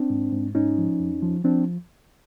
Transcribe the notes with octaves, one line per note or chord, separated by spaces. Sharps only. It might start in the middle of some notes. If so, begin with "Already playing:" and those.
Already playing: C4 D4
G#2
G#2
G#2 C#4 D#4
F3
F2
F3
F3 C4 D4